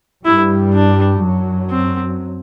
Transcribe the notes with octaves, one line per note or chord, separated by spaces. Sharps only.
G2 G3 E4
D4
F#2 F#3
C4